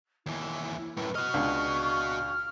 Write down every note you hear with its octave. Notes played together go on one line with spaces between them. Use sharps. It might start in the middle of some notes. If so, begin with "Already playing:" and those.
D#2 E3 E4
F#2 A2 B4
F#4 D#5 C#6 F6
C#2 D4